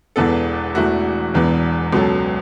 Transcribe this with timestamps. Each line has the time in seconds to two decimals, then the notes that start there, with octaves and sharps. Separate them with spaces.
0.16 E1 E2 E3 B3 A4
0.75 E1 E2 E3 A3 F#4
1.34 E1 E2 E3 B3
1.93 C#2 B2 F#3 C#4 A4